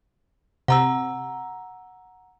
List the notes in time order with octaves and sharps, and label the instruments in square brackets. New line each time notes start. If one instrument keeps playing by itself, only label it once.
[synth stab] C3 [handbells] F#5 A#5 E6